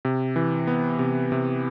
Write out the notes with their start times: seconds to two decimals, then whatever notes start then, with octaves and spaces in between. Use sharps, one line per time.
0.05 C3
0.36 E3
0.67 B3
0.99 C3
1.32 C3